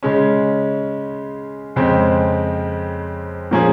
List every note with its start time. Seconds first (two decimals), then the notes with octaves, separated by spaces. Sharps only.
0.03 C#3 G#3 C#4
1.76 F2 C#3 G#3 C4
3.51 A#2 F3 A#3 C#4 G#4